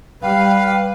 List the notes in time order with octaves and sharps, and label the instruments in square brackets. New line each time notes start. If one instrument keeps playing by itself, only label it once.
[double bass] G3 [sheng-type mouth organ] B4 [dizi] F5 [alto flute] G5